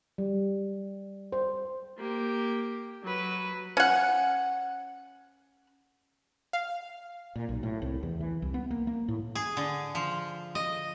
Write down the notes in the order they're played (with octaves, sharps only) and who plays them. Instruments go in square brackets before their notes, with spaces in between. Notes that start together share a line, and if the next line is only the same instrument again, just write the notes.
[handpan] G3
C5
[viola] A#3 G4
F#3 B4
[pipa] C#4 F#5
[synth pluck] F5
[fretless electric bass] A#2
B1
A2
C2
E2
E3
C2
B3
A#3
A#3
A2
[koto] G#4
D3
F3
D#5